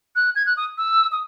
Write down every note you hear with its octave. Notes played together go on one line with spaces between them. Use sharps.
F#6
G#6
F#6
D#6
E6
D#6